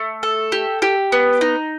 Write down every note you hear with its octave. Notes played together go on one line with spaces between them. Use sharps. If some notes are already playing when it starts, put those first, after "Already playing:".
Already playing: A3
A4
G4
G4
B3
D#4